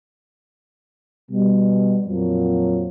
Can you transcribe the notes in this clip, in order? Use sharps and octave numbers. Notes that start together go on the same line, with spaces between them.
B2 G3
F2 A#2 F3 F#3